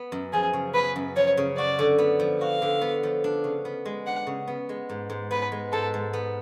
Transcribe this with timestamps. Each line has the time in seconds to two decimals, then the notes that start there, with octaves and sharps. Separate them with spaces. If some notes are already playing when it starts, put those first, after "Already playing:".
Already playing: B3
0.12 F#2
0.33 F3 G#4
0.53 C#3
0.74 B3 B4
0.96 F#2
1.16 F3 C#5
1.37 C#3
1.57 F#4 D5
1.79 D3
1.98 B3
2.20 F3
2.41 F#4 F5
2.62 D3
2.81 B3
3.03 F3
3.24 D4
3.44 C#3
3.65 B3
3.86 G#3
4.06 D4 F#5
4.27 C#3
4.47 B3
4.69 G#3
4.89 G#2
5.10 G#2
5.31 B3 B4
5.52 G#3
5.72 G#2 A4
5.94 G#2
6.13 B3